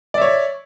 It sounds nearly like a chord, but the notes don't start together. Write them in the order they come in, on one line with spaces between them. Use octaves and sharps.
D5 E5 C#5